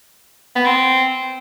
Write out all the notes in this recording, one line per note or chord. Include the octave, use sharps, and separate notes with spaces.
B3
C4